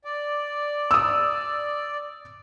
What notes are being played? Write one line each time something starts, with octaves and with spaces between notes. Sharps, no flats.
D5
D#6 E6